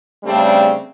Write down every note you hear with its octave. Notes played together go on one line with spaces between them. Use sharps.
C#3 G3 A3 C4 D4 G4